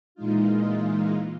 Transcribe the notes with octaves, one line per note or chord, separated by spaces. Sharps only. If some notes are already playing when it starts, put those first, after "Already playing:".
A#2 E3 G#3 D#4 F4